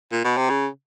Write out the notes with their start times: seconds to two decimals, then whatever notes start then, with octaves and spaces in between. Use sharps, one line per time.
0.12 A#2
0.24 B2
0.37 C3
0.50 C#3